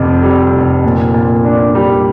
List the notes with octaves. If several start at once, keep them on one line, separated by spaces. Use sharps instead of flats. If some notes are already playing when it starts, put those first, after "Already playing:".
Already playing: F1 F2 C3
G3
F1
A#2
A#2
D4
G3